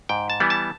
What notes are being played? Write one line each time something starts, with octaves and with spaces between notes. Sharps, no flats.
G#2 G5
A5
E3 G3 B3
A5